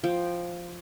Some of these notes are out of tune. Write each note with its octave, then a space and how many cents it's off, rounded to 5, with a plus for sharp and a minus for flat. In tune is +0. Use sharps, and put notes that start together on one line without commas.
F3 +0 G5 +0